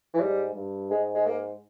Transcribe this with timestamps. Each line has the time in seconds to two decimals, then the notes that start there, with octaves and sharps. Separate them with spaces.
0.14 E3
0.20 G#2 G3
0.55 G2
0.90 G#2 G#3
1.15 G#3
1.26 A#3